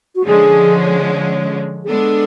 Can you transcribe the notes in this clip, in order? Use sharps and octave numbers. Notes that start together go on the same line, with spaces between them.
F#4
D3 F3 G#3 C#4 G#4
G#4
G#3 B3 D4 A4